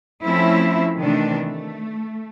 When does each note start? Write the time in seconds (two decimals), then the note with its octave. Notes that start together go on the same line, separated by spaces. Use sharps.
0.23 F3 A3 C4 C#4 E4 E5
0.96 C3 D#3 E3 A3 D4
1.39 A3